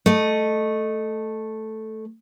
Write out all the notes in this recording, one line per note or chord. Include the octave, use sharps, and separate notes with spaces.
A3 D#5